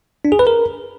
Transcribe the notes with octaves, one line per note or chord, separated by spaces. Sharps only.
D4
G#4
B4
A#4